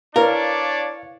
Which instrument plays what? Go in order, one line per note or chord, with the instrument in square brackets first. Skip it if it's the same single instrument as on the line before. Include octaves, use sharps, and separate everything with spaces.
[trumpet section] D4 C#5 D5 [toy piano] E4 B4 [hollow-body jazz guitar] A#4 [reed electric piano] F5